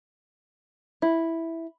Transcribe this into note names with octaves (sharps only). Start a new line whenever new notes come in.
E4